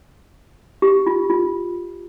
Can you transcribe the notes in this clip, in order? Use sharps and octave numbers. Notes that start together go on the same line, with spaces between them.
G4
F4
F4